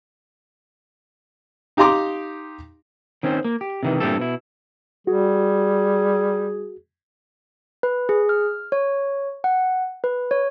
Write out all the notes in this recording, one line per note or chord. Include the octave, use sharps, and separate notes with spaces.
D#4 G4 F5 A#5 C6 D6
D#3 C4 C#4 B4 C5
A#3
G4
C3 D#3 E3
G2 A#2 C4 E4 G4 A4
B2 E4
G3 F#4 G#4
B4
G#4
F6
C#5
F#5
B4
C#5